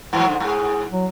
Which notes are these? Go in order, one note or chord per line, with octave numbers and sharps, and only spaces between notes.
G#2 E3 F#3
G#2 D3
G#2 G#4
F#3